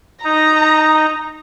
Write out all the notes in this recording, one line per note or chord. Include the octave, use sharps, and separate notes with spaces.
D#4 A#5